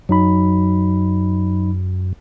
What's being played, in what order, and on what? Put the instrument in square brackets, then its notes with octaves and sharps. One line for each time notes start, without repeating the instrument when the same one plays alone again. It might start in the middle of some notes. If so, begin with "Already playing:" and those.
[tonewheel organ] F#2 [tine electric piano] F#3 D#4 B5